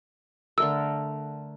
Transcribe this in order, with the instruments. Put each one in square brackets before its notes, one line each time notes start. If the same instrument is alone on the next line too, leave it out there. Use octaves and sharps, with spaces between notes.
[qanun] D3 A3 A#4 [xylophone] E6